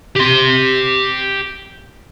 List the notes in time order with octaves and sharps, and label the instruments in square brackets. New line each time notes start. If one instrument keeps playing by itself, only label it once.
[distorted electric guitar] G4 C6